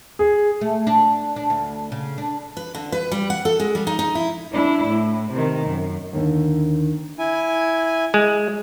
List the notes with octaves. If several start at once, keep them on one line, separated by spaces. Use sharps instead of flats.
G#4
A3
D4
D4
D2
C#3
D4
B4
D3
B4
G3
F#5
A4
G#3
G3
D#4
D#4
E4
D4 E4
A2
C3 D#3
F#2
D#2 D3 D#3
E4 G#5
G#3